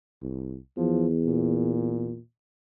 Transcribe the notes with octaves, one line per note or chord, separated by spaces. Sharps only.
C2
E2 F3
A#2